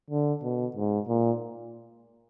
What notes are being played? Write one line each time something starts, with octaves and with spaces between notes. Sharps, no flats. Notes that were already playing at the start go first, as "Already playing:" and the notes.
D3
B2
G#2
A#2